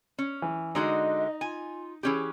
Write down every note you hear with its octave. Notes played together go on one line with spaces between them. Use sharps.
C#4
E3
D3 G#3 D#4 F#4 D#5
F4 G#5
E3 C#4 G4 G#4